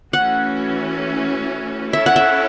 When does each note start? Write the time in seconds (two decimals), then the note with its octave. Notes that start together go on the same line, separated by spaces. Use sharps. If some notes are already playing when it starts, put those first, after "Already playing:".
0.13 E3 A3 C#4 F#4 F#5
1.93 C#4 E4 A4 C#5 E5
2.06 F#5
2.16 E5